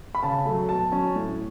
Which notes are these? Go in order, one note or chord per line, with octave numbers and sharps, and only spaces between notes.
B5
C#3 A5
F#3 A3
B2 A5
F#3 C#4
A2